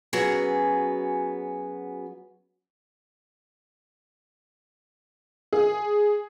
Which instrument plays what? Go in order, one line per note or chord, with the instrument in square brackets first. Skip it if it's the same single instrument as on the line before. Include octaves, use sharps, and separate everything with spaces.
[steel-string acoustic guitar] F#3 B3 C#4 F#4 G#4
[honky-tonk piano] G#4